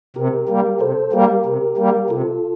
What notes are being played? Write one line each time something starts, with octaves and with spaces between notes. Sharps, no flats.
C3 G4 A#4
G3 A#3
C3 A4 C5
G3 A#3 G4 A#4
C3
G3 A#3
C3 F4 A4